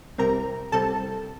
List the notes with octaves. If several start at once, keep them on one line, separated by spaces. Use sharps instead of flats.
C2 C3 G3 C4 A#4 A#5
C2 C3 G3 C4 A4 A5